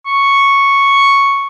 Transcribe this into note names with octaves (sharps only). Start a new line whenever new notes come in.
C#6